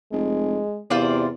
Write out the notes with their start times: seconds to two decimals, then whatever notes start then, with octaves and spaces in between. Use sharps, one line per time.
0.12 F1 G#3
0.90 E2 C3 F4 C5 D5